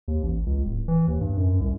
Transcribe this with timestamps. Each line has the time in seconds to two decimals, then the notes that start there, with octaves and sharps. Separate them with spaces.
0.08 D#2
0.23 A1
0.46 C#2
0.65 D1
0.88 E3
1.07 D#2
1.21 G2
1.38 F#2
1.61 C2